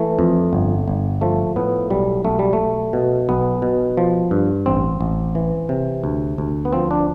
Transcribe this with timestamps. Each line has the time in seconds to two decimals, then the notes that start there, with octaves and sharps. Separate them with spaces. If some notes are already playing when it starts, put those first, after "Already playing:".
Already playing: E3 A3
0.19 F2
0.53 G1
0.88 G1
1.21 F3 A3
1.56 A2 B3
1.90 B1 G3
2.25 B1 A3
2.39 G3
2.53 A3
2.59 B1
2.93 B2
3.29 B1 B3
3.62 B2
3.97 F3
4.31 G2
4.66 A1 C4
5.01 A1
5.35 E3
5.69 C3
6.04 D2
6.38 D2
6.65 B3
6.73 F3 C4
6.91 D4